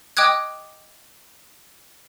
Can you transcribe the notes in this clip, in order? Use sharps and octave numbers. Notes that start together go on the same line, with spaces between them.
D#5 G5 D6 D#6 F#6 G#6